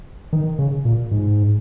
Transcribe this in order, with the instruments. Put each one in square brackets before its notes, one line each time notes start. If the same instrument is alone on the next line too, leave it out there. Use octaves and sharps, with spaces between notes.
[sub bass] D#3
C#3
A#2
G#2